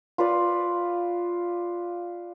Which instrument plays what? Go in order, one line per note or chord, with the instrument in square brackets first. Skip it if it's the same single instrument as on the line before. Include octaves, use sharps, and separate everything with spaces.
[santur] F4 B4 D5